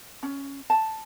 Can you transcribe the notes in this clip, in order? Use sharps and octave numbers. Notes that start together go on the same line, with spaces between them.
C#4
A5